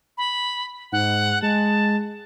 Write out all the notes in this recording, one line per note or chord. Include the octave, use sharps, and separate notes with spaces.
B5
G#2 F#5
G#3 A5